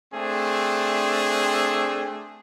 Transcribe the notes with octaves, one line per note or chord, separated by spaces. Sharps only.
A3 C4 D4 G#4